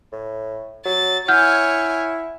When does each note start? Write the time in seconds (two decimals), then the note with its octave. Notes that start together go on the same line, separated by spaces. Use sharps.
0.12 A2
0.86 F#3 A6
1.28 E4 C#5 F#5 G#5 F6 G6